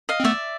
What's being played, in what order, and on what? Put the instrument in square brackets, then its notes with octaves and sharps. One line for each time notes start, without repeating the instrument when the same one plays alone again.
[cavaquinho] D#5 F5
[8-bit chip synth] C4
[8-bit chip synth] A3 B3 [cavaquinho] D5 E5